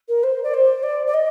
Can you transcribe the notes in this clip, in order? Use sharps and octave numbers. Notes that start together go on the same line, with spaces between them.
A#4
C5
D5
C5
D5
D5
D#5